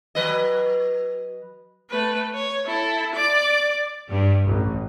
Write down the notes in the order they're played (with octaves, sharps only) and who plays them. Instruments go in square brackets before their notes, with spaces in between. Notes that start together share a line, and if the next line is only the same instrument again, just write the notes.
[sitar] F#3 B4 D#5
[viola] A3 B4
C#5
E4 A4
D5 D6
[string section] G2
A1